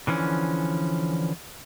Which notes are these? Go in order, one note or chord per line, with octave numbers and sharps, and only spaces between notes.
D3 E3 F3 C#4